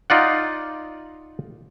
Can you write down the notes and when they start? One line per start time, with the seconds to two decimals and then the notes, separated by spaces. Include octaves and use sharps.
0.10 D#4 F4 D5 F#5